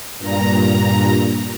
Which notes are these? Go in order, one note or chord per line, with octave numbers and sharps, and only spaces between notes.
G2 A#2 A#5